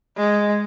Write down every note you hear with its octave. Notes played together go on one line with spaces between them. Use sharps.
G#3